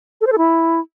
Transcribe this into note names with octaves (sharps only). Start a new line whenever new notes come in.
A4
C5
A4
E4